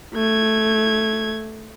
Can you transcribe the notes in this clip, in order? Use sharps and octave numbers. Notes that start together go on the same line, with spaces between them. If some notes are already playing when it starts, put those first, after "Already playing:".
A3 G#6